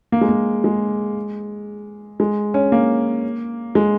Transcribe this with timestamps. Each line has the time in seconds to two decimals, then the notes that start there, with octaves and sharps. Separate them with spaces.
0.12 A#3
0.21 G#3
0.29 A#3
0.64 G#3
2.20 G#3
2.54 C#4
2.72 A#3
3.75 G#3